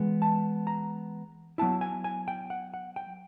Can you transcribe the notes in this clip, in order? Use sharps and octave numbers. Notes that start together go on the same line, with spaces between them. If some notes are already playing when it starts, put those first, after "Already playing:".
Already playing: E3 G#3 B3
A5
A#5
F#3 B3 E4 A5
G#5
G#5
G5
F#5
F#5
G5